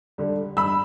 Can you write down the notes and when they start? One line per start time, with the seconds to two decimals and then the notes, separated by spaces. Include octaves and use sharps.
0.18 D3 G3
0.57 G2 B5 E6